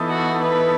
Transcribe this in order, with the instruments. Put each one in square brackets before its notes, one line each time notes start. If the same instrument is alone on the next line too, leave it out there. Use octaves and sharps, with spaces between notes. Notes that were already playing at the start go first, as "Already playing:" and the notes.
Already playing: [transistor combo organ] E3 B3 D#4 A4
[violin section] F#4
B4